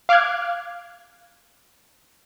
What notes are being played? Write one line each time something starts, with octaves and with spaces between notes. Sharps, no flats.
F5 D6 F6 F#6 G#6